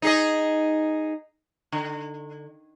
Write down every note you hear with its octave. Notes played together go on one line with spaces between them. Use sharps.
D#4 G#4 D#5
D3